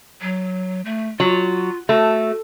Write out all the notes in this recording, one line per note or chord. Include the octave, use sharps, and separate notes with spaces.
F#3
A3
F#3 F4
A3 F#4